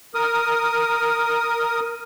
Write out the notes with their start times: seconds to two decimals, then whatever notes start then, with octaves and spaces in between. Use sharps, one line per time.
0.14 A#4 D#6